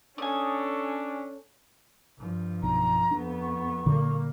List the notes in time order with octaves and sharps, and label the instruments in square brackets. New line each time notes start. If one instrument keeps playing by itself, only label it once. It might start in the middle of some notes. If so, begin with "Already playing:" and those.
[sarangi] C#4 [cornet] D4 [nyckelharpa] A4 C#5 [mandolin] G#5 D#6
[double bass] G2 F3
[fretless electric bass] B1 [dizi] A#5
[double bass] F2 B3 [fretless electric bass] D4
[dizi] C#6
[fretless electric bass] A#2 D3 [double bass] G3 A#3